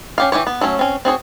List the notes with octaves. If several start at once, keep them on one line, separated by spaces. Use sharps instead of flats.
C#4 G4 F5
E3 C#4 G4 C#5
B3
F#3 A3 C#4 C#5
C4 C#4
C4 F#4 G#4 C#5